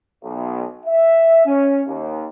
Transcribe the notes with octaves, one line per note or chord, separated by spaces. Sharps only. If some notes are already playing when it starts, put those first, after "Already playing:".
B1
E5
C#4
D#2